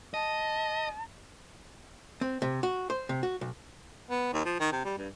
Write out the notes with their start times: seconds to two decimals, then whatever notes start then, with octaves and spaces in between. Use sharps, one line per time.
0.14 D#5 A5
2.21 C4
2.42 C3
2.63 F#4
2.90 C5
3.09 C3
3.23 F#4
3.41 B1
4.10 B3
4.33 D#2
4.45 F3
4.60 D#3
4.72 C3
4.85 G3
4.98 G2